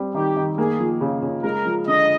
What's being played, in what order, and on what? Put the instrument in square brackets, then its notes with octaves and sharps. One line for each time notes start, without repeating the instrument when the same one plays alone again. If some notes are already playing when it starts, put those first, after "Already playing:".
Already playing: [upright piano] G3 C4
[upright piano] D#3 [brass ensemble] G4
[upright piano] D#3
[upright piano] A#3 [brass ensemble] G#4
[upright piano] F3
C#3
C#3
[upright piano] G#3 [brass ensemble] A#4
[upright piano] F3
[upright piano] D3 [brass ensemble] D#5